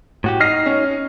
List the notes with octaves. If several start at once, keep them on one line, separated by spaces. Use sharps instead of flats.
A2 F#4 G4
D#4 F6 A#6 C7
C#4